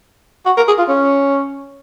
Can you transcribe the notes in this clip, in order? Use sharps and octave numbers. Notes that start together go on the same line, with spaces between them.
F#4
A#4
G#4
F4
C#4